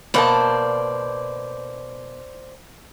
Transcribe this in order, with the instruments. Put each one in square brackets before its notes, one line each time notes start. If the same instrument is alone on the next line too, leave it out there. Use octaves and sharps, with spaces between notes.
[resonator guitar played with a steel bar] B2 A#3 A5 [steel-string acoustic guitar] C5 D5